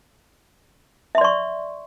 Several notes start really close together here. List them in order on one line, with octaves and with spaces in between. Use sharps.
E5 C6 D5 C#6